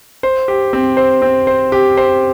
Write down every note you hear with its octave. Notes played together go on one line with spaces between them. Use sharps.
C5
G4
C4
C5
C4
C5
G4
C5